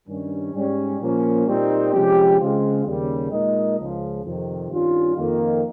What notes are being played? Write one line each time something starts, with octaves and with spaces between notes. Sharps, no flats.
G2 D#3 G3 C#4
G#2 G3 C#4
A#2 F3 A#3 C#4
A#2 G3 C4 D#4
C3 F3 G#3 C#4 G4
C#3 G#3 C4 F4
D#2 C#3 G3
A#2 G#3 D#4 A#4 D#5
C#2 C#3 F3
F2 C3 D#3
G2 D#3 G3 C#4 F4
F2 D#3 A#3